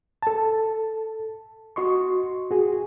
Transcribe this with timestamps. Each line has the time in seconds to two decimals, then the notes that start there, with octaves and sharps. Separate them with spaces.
0.22 A4 A5
1.76 F#4 D#5 C6 C#6
2.51 F#4 G#4